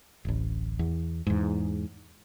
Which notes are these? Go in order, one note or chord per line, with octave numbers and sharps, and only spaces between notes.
D1 A1
E2
E2 G#2